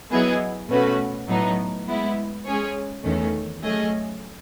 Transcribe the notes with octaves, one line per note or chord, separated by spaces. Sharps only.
F#3 B3 E4 G#4 D#5
B2 A3 C#4 F#4 B4
A2 F#3 B3 D#4
G#3 B3 E4
G#3 C#4 G#4 C#5
E2 D#3 A3 C#4
F#3 A3 C#4 G#4 D#5